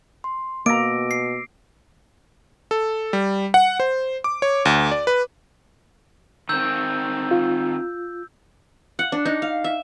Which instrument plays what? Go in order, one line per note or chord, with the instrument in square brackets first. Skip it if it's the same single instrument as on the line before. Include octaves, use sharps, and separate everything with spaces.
[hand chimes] C6
[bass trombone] B2 [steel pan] A#3 A#5 [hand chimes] D6 E6 A#6 [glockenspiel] D7
[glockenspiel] C7
[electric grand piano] A4
G3
F#5
C5
D6
C#5
D2
D5
B4
[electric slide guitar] D#3 C4 [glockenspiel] E6 G6
[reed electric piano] F4
[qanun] F#5
D4
D#4
F5
E5